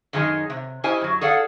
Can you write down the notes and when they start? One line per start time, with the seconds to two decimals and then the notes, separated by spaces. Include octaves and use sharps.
0.13 F#2 D#3 G#3 D#4 G#4
0.50 C3
0.84 C#4 E4 G4 C5 D#5 G#5
1.01 F#2 F#3
1.21 G#4 A4 D5 F5 F#5